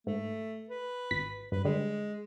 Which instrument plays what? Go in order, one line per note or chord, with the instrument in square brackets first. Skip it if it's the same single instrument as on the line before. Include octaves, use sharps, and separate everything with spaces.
[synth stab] G#2 [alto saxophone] A3
[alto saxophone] B4
[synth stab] G#1 B6
[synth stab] G2 [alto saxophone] B4
[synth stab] D3 G3 [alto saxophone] G#3